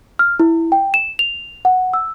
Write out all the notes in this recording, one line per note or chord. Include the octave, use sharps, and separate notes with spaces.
F6
E4
G5
E7
F7
F#5
E6